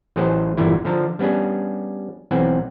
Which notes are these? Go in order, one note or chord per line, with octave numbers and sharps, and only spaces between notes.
A1 A2 F#3 G#4 C5 D#5
G1 A#2 D3 E3 E4
D3 F3 A5 A#5
G3 B3 C#4 D4 G#4
B1 E3 C4 F#5 G#5